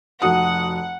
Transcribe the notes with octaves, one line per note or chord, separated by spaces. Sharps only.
F1 F#4 F#5 D#6